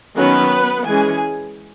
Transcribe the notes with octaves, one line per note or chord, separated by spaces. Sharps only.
D#3 F#3 B3 C#4 B4
E3 G#3 C#4 G#4 G#5